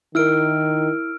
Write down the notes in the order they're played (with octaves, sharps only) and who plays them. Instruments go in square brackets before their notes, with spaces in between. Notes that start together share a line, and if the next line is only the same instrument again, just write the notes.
[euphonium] D#3 [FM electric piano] E4 A#4 [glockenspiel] E6 F6 D7